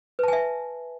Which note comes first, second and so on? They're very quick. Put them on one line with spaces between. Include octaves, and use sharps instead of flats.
B4 A5 G#5 E5